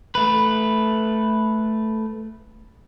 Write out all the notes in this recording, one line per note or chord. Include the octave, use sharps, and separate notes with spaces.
A3 B4